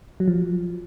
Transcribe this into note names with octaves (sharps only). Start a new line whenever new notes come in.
F#3
F3